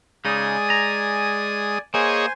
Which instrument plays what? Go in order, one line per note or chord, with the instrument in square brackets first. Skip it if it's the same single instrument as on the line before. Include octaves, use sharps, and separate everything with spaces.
[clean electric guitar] C#3 D#4 [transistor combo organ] G#3 D#6 [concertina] D5 G#5
[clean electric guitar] A#5
[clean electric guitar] A#3 [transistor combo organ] G#4 C#5 D#5 [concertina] C5 G#5 C6